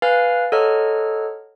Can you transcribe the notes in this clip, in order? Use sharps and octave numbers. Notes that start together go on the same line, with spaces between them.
B4 F5 G#5 F6 A6
A4 C#5 D#5 F#5 A#5 F6